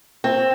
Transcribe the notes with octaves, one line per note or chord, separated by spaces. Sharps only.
C4